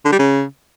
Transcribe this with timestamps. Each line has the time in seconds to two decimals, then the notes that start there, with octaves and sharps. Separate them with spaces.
0.05 D3
0.12 G3
0.19 C#3